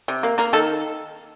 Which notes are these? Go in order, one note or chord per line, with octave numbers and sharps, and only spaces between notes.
C3
A#3
A#3 A#4
D#3 A4